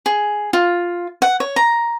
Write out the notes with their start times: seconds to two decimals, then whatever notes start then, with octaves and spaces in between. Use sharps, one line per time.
0.06 G#4
0.53 F4
1.22 F#5
1.40 C#5
1.56 A#5